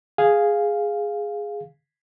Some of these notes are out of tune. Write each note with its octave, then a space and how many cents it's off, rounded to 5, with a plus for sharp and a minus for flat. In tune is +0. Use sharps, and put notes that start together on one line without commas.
G#4 +0 F5 +0